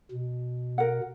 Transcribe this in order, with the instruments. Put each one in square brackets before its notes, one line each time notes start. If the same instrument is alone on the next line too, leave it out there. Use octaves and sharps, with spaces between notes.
[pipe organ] B2
[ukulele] A#4 F#5